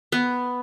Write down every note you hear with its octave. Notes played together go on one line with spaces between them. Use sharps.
B3